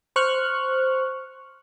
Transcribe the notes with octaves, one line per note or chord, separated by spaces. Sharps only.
C5 C#6 F6 F#6